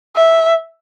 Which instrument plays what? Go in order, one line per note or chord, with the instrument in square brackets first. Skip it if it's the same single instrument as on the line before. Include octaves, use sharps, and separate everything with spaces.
[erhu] E5